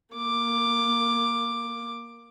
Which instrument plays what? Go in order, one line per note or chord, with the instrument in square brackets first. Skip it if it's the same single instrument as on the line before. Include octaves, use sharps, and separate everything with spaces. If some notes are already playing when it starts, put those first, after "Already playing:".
[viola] A#3 D6